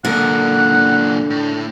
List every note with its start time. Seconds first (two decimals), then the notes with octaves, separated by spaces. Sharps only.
0.05 F#2 A#2 D3 A#4 F#5
1.30 A2